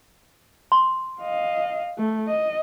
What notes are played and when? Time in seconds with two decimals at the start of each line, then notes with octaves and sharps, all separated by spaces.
0.72 C6
1.21 D#5 F5
1.98 A3
2.28 D#5